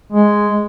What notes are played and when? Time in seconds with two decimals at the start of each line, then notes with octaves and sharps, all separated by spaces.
0.12 G#3